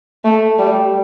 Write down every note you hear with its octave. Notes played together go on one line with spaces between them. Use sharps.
A3
G3